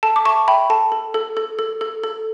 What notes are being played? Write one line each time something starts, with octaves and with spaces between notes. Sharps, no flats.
A4 A5
D6
E5 A5 C#6
E5 G5 B5
A4 A5
A4
A4
A4
A4
A4
A4